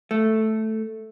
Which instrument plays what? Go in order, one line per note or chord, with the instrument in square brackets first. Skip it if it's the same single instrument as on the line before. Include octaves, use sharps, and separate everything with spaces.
[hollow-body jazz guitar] A3